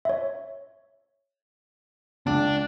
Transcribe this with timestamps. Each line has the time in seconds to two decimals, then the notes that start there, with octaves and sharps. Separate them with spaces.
0.05 C#5 E5
2.27 C#2 D4